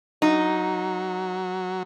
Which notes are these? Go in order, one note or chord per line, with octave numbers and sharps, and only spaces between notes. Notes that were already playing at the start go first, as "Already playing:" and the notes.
F#3 D#4